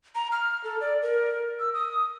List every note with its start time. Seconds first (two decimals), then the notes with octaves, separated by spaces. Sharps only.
0.15 A#5
0.32 F6
0.64 A4
0.81 D5
1.02 A#4
1.59 E6
1.74 D#6